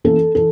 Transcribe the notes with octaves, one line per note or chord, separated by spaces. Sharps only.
E3 A#3 C#4 A4
E3 A4